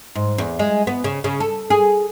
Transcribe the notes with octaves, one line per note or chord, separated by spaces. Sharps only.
G#2
E2
G#3
B3
C#3
C#3
A4
G#4